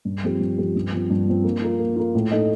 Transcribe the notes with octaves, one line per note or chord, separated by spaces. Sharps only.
G2
F3 C4 G4
G2
F3 C4 G4
G2
F3 C4
G2
F3 C4
A#3
F4 A#4
A#3
F4 A#4
A2
A3 D#4 A4 D#5